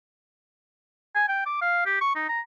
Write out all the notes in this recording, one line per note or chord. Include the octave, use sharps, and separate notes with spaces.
G#5
G5
D6
F5
G4
C#6
D#4
A#5